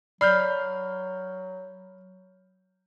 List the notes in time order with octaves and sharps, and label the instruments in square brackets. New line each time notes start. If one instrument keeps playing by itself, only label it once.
[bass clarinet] F#3 [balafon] D5 [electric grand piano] B5 F6 G6